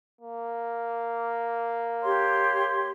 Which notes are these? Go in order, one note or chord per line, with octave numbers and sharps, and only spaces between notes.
A#3
G4 C#5 C6